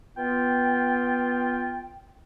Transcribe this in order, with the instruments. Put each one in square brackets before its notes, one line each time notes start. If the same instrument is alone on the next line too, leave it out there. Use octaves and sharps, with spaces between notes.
[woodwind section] B3 F4 G5